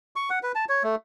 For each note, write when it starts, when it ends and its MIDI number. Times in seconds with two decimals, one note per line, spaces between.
0.16 0.29 85
0.30 0.39 78
0.43 0.52 71
0.55 0.65 81
0.69 0.83 73
0.83 0.95 57